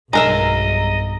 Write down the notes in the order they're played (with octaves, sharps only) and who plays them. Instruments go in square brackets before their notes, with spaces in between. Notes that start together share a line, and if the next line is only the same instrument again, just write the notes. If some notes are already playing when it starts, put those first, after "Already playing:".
[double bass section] B1 G2 [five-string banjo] G#3 A#4 E5 [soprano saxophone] D#5 [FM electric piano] A#5